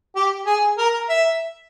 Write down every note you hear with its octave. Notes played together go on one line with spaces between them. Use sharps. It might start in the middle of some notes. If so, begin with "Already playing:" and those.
G4
G#4
A#4
E5